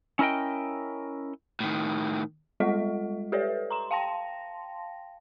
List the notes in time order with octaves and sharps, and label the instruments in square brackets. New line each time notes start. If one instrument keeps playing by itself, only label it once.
[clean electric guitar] C#4 E4 A#4 D#5 G5
[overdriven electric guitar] A2 D#3
[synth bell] G3 G#3 F4 A4 D#5 F#5
G4 A4 B4 C#5 D5 E5
A#5 C6 E7
F5 G5 A5 C6 A#6